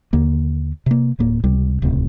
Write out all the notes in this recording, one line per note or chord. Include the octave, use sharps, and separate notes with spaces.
D#2 D3 A#3
C3 A#3
D1 A2 A#3
C#2 C3 G3
D#1 C#2 A2 C3